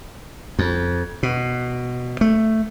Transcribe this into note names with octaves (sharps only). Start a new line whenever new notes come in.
F2
B2
A3